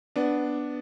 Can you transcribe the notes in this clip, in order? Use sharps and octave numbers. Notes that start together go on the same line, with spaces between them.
B3 D4